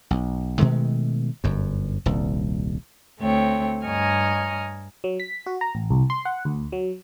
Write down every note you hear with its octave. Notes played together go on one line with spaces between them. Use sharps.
B1
B2 D#3 G#3 A3
G1 F#2
D#1 C2
D2 A3 C4 C#5 G5
G2 C#5 D#5 G#5 A#5 F6
F#3
B6
F#4
A#5
A1
C2
C6
F#5
D2
F#3